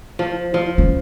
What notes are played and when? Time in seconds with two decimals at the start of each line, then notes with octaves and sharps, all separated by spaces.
0.19 F3
0.54 F3
0.78 C#4